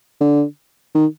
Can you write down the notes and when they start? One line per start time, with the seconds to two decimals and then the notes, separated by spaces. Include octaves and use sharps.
0.21 D3
0.95 D#3